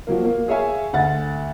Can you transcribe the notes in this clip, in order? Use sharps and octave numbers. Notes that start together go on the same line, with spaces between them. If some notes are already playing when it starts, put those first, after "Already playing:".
F3 F#3 A#3
A#3
G#4 C#5 E5 F5 G#5
D2 F#5 A6